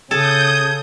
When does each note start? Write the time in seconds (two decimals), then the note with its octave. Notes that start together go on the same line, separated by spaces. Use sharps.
0.11 C#3 A4 D#6 G6 G#6